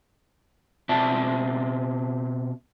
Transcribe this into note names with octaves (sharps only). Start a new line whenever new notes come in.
B2 C4 D5 E5 A5